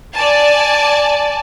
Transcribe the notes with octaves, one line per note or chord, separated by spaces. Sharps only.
D5 G#5 A5